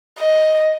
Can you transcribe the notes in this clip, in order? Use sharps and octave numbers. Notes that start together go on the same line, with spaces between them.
D#5